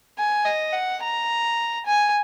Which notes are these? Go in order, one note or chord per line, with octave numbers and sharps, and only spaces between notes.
G#5
D#5
F#5
A#5
G#5